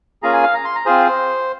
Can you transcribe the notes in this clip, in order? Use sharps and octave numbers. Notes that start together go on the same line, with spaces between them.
A#3 C#4 F4 G#4 A#5
G#5
F5
A#5
C6
A#5
C4 F4 G#4 C5